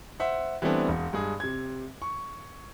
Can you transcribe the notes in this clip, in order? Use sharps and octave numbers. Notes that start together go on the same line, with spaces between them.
C5 E5 F#5
E3 G3 A3 B3 C4 D4
E1
G2 G#3 G#4
C3 G#6
C#6